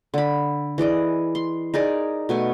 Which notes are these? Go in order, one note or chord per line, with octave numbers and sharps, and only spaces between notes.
D3 B5
E3 G#4 D5 D#5
C6
D#4 G#4 A#4 D5
B2 A3 G#5